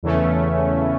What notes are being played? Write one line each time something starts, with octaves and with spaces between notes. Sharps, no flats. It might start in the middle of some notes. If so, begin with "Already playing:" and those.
E2 C#3 E3 A3 C#4